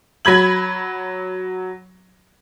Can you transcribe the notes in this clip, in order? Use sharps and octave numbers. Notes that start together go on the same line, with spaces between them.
F#3 B5 G#6 F#7